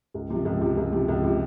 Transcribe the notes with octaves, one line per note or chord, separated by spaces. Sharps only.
C#2
C3 F3
C#2
C3 F3
C#2
C3 F3
C#2
C3 F3